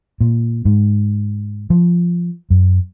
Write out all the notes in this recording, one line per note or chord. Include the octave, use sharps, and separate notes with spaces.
A#2
G#2
F3
F#2